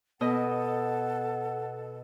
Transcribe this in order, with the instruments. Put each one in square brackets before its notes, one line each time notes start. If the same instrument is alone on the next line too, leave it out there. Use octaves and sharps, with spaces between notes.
[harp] B2 D#5 [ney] A4 [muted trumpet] F#5